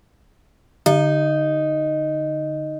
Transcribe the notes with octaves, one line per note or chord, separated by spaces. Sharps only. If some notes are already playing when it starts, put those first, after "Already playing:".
D3 D#4